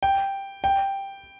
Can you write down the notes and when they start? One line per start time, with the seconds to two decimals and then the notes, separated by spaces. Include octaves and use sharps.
0.03 G5
0.64 G5